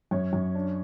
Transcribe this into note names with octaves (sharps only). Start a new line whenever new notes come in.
F#2 C#5
F#2
D4